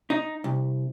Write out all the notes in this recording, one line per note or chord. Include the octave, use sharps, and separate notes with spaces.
D#4
C2